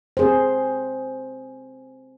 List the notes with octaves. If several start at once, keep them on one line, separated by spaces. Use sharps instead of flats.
C4 G#4 C5